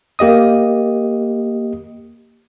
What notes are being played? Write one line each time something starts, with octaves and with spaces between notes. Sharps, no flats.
A#3 G4 D#5 D#6